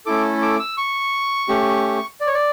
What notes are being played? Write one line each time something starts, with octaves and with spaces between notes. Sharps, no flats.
A3 C#4 E4 A4 D6
D6
E6
C#6
A3 C#4 G4
D5
C#5
D5